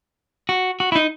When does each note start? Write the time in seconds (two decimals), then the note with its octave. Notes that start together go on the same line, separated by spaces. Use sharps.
0.49 F#4
0.80 F#4
0.92 E4
0.96 D#4